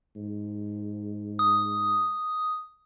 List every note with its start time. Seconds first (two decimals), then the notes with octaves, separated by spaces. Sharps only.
0.16 G#2
1.39 D#6